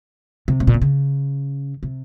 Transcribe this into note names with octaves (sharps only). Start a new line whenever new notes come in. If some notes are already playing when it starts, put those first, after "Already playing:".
C3
A2
A#2
C3
C#3
C3